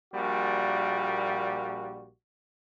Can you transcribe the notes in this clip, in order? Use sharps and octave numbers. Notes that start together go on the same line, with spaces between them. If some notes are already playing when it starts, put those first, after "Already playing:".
A#1 A#2 G3 F#4